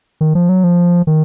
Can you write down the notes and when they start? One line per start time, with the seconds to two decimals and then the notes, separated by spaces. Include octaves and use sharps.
0.21 D#3
0.35 F3
0.49 F#3
0.64 F3
1.07 D#3